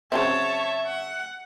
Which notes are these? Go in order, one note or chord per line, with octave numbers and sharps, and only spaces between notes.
C#3 F#3 C4 C#5 E5 A5
F#5